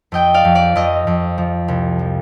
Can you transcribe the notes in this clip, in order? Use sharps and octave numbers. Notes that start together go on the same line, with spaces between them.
F2 D#5 G5
D5 F5
F2
D5
F2 D#5
F2
F3
C2
F3